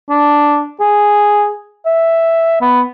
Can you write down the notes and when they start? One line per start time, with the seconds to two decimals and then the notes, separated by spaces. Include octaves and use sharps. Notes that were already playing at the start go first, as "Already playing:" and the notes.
0.10 D4
0.80 G#4
1.86 E5
2.61 B3